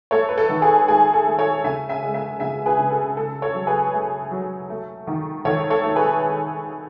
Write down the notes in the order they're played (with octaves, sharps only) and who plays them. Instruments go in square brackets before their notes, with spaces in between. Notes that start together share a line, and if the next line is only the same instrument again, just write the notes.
[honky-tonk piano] A3 A4 C#5
B4
A4
D#3
G#4 B4
A3 G#4
A4
A3
A4 C#5
C#3 E5 G#5
E5 G#5
G#3
E5 G#5
C#3 E5 G#5
G#4 B4
C#3
A4
A3 A4
A4 C#5
F#3
G#4 B4
A3
F#3
A3
D#3
D#3 A4 C#5
A4 C#5
A3
G#4 B4